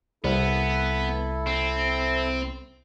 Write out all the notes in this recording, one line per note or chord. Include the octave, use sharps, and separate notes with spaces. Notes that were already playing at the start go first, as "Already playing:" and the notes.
C2 B3 E4 A4
C4